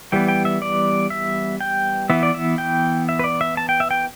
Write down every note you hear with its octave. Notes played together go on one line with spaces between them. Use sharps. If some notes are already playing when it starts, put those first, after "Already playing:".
E3 G3 B3 G5
G5
E5
D5
E5
G5
E3 B3 E5
D5
E5
G5
E5
B4
D5
E5
A5
G5
E5
G5